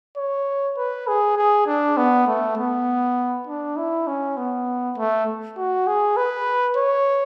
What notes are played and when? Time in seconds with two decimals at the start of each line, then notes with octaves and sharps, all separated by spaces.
0.17 C#5
0.77 B4
1.07 G#4
1.37 G#4
1.67 D4
1.97 B3
2.27 A3
2.57 B3
3.47 D4
3.77 E4
4.07 C#4
4.37 B3
4.97 A3
5.57 F#4
5.87 G#4
6.17 B4
6.77 C#5